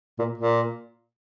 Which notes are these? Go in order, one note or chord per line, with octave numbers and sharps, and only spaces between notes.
A#2
A#2